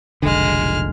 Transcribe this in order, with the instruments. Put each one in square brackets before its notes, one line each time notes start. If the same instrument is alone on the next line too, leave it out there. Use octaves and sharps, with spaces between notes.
[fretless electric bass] F1 B1 D3 [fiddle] G#3 F6